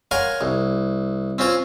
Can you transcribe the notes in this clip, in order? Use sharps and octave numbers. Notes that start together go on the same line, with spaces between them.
A#4 C#5 F5 F#5 G#5 C6
C2
C4 C#4 F4 C5 C#5